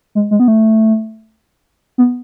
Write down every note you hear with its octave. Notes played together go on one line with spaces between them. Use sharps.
G#3
G#3
B3
A3
B3